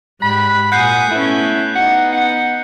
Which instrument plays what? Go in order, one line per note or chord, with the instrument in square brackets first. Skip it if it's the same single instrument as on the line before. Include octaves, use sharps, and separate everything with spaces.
[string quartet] G#2 G3 F#6 [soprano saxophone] B5
[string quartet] A#2 G#5 D#6 [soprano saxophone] F#5 [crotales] F#6 G6 C7
[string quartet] A3 B3 C#4 [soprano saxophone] E4
[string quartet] B3 D#4 [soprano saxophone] F#5
[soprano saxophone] F#5